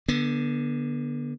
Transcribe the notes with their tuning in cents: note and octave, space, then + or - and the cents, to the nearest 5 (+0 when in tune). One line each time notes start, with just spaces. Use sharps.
D3 +0 B3 -30